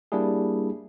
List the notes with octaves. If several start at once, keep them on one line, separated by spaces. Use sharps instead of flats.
G3 A#3 D4 E4 G#4